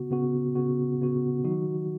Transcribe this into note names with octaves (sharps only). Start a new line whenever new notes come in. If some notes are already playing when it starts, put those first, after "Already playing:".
Already playing: C#3 B3 F#4
C#3 B3 F#4
C#3 B3 F#4
C#3 B3 F#4
D#3 F#3 D#4 F#4